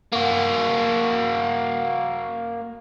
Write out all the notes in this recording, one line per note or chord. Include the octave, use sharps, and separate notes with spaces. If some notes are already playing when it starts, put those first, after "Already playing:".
A#3 F#4